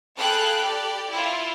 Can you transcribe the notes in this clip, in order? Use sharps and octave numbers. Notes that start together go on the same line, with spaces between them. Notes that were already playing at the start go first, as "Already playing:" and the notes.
G#4 A4 F5 G5 B5 F#6
G4 D5
E4 F4